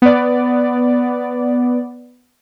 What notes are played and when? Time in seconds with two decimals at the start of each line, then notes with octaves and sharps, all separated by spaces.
0.02 B3 D5